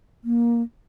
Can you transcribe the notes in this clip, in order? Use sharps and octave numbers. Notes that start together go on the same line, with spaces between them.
A#3